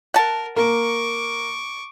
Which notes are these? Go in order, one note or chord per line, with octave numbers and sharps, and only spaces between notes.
A#4 F#5 A5
A#3 C#6 D6